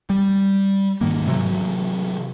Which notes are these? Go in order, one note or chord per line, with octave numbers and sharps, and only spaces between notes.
G3
G#2 D#3 A#3
C3 E3 F#3